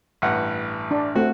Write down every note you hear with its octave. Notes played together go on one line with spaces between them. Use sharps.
A1 G2 F#5
D4
A3 C4 F#4